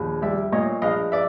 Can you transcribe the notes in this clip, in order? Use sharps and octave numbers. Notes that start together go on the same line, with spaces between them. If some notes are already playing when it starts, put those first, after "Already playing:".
Already playing: A#1 D#2
G3 D5 E5
A#2 C#5 D#5
A#1 D#5 F5
D5 E5